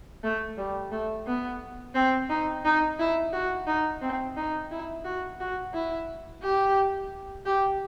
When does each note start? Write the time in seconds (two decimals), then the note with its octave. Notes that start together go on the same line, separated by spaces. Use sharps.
0.23 A3
0.57 G3
0.92 A3
1.27 B3
1.95 C4
2.29 D#4
2.65 D#4
2.99 E4
3.33 F#4
3.67 D#4
4.02 C4
4.36 D#4
4.71 E4
5.05 F#4
5.40 F#4
5.73 E4
6.43 G4
7.46 G4